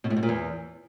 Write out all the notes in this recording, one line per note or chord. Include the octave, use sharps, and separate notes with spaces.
B2
A2
B2
A#2
E2